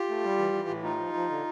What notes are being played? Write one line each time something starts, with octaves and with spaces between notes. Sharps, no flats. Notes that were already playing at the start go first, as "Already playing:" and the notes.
Already playing: F4 G4
A3
G3
E3
E3
A2
A3 D#4 F4
F3
F3
D3